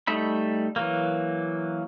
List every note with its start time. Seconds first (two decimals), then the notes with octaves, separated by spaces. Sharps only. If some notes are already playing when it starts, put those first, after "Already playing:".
0.07 G3 A3 D#4 E5 B5
0.76 E3 F#3 A#3